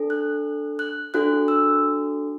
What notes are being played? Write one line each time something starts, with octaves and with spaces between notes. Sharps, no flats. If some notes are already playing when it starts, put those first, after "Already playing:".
Already playing: D4 A4
F#6
F#6
D4 F#4 A4 F#6
E6